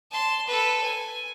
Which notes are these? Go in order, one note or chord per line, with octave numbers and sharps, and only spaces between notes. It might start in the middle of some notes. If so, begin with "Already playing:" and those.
A5 C6
A4 B4
G#5